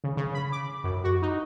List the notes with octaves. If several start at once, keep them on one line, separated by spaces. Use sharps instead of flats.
C#3
C#3
B5
D6
F#2
F#4
D#4